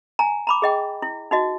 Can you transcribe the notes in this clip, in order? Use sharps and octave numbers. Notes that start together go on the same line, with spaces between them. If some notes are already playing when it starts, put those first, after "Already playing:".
G#5 A#5
A#5 B5 D6
G#4 D#5 G5
E4
D#4 F#4 D#5